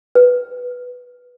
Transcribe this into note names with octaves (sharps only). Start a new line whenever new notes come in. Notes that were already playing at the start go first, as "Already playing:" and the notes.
B4